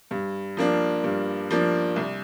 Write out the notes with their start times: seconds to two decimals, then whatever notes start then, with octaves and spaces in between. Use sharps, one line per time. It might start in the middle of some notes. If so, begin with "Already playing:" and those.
0.11 G2
0.57 F3 A#3 D4
1.04 G2
1.51 F3 A#3 D4
1.96 C2